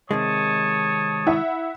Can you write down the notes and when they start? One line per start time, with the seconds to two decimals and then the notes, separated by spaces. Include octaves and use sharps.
0.11 C3 D#3 G#3 C#5 A5 D#6
1.26 E4 E5 F#5